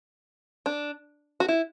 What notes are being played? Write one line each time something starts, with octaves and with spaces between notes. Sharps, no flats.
D4
F#4
E4